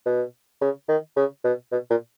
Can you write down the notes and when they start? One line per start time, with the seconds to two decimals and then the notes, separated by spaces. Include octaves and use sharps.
0.06 B2
0.61 C#3
0.88 D#3
1.16 C#3
1.44 B2
1.72 B2
1.90 A#2